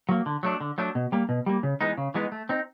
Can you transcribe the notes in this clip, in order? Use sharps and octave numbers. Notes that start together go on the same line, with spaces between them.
F#3 A#3
D3
F#3 A3 D4
D3
F#3 A3 D4
B2
G3 A#3
B2
G3 A#3
C#3
E3 G#3 B3 D#4
C#3
E3 G#3 B3 D#4
A3
C4 D#4